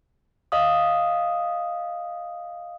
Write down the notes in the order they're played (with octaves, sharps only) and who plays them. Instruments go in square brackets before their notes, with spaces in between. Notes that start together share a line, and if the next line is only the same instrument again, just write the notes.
[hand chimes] D#5 F5 D#6